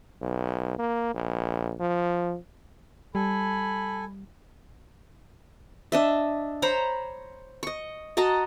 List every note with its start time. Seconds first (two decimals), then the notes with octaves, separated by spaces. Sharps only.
0.22 B1
0.79 A#3
1.14 A#1
1.80 F3
3.15 G3 A4 G#5 B5
5.92 D4 D#5 E5
6.62 C5 C#5 A#5 B5
7.63 D#5 C#6
8.17 F#4 D#5 A5 A#5